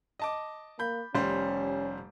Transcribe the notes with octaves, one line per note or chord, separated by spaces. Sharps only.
D#5 A5 D6
A#3 B5 G6
F1 G3 C#4 C5